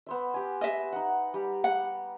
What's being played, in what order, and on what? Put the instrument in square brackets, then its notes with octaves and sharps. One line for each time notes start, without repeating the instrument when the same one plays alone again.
[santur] B3 C5 E5
G4 G#5
[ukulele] D#5 E5
[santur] D#4 F#5
G3 G4
[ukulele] F#5